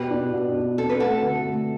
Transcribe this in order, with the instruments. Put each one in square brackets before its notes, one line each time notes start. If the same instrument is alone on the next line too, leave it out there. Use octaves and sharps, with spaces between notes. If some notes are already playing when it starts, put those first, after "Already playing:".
Already playing: [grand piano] B2 [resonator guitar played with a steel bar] G4 B4
[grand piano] D4
B2
D4
[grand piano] C4 [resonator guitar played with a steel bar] A4
[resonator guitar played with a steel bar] B4
[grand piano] A3 [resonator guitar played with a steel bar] F#4 A4
[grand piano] D3
A3